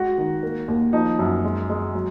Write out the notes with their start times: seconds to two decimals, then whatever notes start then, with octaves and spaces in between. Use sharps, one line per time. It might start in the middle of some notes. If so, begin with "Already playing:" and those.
Already playing: G#3 F#4
0.18 D#3
0.43 A#3
0.68 D#2
0.93 F3 D#4
1.19 F#2
1.44 G#3
1.70 G#3
1.95 F#3